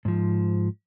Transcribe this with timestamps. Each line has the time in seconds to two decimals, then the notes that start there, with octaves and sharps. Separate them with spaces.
0.05 G#2 F3